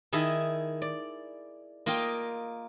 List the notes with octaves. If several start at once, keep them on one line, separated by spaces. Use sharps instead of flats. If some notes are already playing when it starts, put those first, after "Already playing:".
D#3 E4 G#4 D#5 E5 A5
D5
A#3 F4 D#5 G5